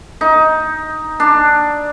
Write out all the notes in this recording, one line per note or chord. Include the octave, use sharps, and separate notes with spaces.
D#4
D4